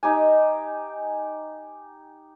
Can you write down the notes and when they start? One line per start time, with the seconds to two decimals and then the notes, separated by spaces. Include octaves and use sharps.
0.03 D#4 G4 G#5